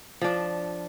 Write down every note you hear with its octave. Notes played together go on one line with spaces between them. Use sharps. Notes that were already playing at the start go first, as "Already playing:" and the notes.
F3 D4